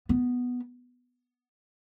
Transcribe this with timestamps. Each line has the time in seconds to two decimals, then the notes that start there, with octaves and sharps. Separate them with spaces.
0.09 B3